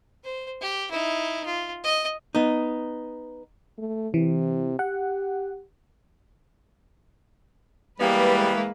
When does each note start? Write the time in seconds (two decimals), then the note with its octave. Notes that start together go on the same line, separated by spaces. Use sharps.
0.24 C5
0.61 G4
0.91 D#4 E4
1.46 F4
1.84 D#5
2.35 B3 D#4
3.78 A3
4.14 C3 E3
4.79 G4 F#5
8.00 E3 G3 G#3 A#3 B3 B4